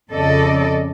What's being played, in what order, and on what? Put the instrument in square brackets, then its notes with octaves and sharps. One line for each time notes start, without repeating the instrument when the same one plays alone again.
[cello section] F2 C#3 A4 D5 D#5